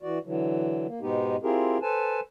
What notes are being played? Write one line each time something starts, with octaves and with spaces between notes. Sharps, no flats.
E3 F#4 D5
D3 E3 F#3
A#3
G#2 B2 G#3 B3 D#4 G4
C4 E4 F4 G4 G#4 A#4
A4 B4 C5 G#5 A5